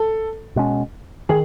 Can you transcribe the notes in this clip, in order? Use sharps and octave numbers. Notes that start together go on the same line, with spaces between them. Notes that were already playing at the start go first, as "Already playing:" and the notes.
Already playing: A4
B2 G#3 C#4
D#3 G#4